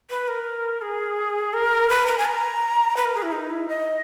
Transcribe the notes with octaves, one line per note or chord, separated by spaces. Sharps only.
B4
A#4
G#4
A#4
B4
A#5
G#5
A#5
B4
A#4
G#4
E4
D#4
E4
D#5